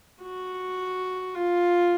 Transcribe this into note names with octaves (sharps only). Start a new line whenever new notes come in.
F#4
F4